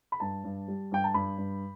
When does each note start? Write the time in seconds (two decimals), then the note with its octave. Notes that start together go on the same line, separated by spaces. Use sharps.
0.12 B5
0.20 G2 A5
0.44 G2
0.68 G3
0.92 G2 G5
1.04 A5
1.14 G2 B5
1.38 G2